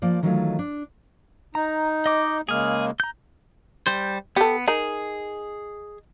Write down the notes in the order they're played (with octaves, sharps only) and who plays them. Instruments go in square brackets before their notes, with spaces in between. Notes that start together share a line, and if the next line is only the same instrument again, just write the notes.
[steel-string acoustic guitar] F3 A#3 D5
D#3 E3 F#3 A3 D#4 F4
D4
[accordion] D#4 [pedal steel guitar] A#5
[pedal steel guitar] D#5 D6
[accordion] C#3 G#3 A#3 [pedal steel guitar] G#4 F6
[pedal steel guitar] A#5 G6
[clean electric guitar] G3 C5
[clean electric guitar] B3 [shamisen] G4 A4
[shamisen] D#4 A#4 [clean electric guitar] G#4